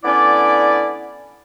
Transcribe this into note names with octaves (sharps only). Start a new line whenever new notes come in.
D3 B3 C#4 E4 D5